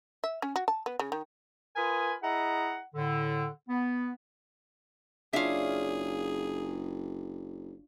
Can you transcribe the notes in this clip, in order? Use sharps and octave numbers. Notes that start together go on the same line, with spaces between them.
E5
C#4
F#4
A5
B3
C#3
D#3
F4 A#4 B4 G#5 B5 D#6
E4 G#4 D#5 E5 F#5 A#5
A2 D3
B3
F#1 D4 F4 G#4 C#5 E5 F5